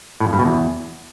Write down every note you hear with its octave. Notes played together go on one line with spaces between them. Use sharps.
A2
F2
G2
B2
E2